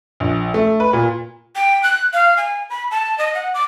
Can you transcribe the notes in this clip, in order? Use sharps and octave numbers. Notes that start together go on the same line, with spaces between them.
A#1
A3
B4
A#2
G5
F#6
F5
G#5
B5
A5
D#5
F#5
D6